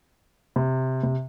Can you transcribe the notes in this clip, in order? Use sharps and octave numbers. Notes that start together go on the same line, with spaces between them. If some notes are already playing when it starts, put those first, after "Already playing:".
C3
C3